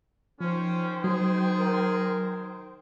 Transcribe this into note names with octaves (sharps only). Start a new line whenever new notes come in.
D#3 F3 C#4 C5 G5
F#3 G#4
A#4